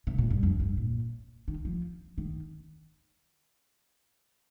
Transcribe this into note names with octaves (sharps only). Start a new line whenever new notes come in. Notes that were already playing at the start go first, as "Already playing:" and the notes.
C3
A#2
G2
F2
G2
A#2
D#3
F3
D#3